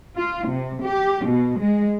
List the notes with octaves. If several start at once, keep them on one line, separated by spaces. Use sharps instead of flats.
F4
C3
G4
B2
G#3